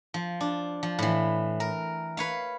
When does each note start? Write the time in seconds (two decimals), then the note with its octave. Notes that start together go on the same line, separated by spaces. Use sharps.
0.14 F3
0.41 D4
0.83 F3
0.99 A2 E3
1.60 A#4
2.17 B4 C#5 F5